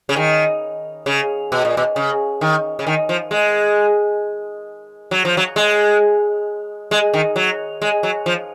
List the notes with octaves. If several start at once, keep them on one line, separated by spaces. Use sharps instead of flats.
C#3
D#3
C#3
B2
A#2
B2
C#3
D#3
C#3
D#3
F3
G#3
F#3
F3
F#3
G#3
G#3
D#3
F#3
G#3
F#3
F3